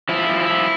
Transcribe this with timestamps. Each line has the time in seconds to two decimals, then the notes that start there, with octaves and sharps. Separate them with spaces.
0.09 F3 E4
0.29 F3
0.40 E4
0.50 F3